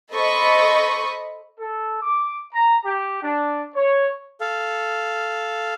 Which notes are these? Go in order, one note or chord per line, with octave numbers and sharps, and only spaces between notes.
A4 C5 D#5 B5 C#6
A4
D6
A#5
G4
D4
C#5
A4 F5